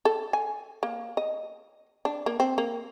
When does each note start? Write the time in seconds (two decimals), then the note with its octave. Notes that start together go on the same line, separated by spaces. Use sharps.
0.05 A4
0.33 G#5
0.83 A#3
1.17 D#5
2.05 D4
2.26 A#3
2.40 C4
2.58 A#3